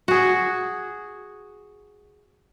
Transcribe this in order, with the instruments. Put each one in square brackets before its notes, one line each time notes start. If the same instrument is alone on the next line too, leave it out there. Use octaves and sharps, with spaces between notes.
[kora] F#4 G#4